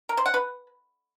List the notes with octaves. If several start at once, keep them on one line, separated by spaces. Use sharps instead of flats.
A#4
C5
F#5
B4